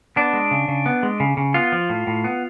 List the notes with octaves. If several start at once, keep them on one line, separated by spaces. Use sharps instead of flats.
B3 D4
G#3
C#3
C#3
B3
G#3
C#3
C#3
B3 F4
F3
A2
A2
B3